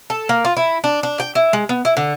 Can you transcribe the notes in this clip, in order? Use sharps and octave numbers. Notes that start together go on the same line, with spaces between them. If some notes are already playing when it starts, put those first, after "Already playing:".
A4
A#3
F4
E4
D4
D4
G5
E4
G#3
B3
E4
D3